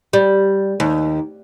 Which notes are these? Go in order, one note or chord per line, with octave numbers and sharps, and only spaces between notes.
G3
D#2